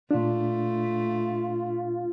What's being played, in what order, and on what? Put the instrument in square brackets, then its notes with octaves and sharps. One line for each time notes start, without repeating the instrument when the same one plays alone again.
[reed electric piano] A#2 D4 [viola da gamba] A3 [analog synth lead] F4